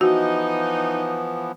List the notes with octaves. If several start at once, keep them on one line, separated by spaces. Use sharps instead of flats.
E3 F3 B3 D#4 F#4